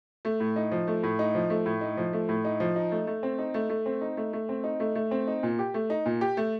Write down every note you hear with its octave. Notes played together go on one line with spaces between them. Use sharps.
A3
A2
D#4
F3
A3
A2
D#4
F3
A3
A2
D#4
F3
A3
A2
D#4
F3
D#4
A3
A3
C4
D#4
A3
A3
C4
D#4
A3
A3
C4
D#4
A3
A3
C4
D#4
A#2
G4
A3
D#4
A#2
G4
A3